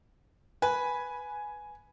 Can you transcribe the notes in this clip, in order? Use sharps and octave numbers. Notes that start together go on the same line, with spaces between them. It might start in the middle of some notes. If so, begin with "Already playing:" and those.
B4 G#5